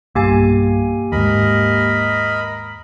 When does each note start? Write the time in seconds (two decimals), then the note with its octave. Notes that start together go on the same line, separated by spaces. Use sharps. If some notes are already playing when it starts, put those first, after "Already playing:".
0.15 B1 G2 A#3 G4 G#5
1.12 D#2 G#2 A#4 D#5 B5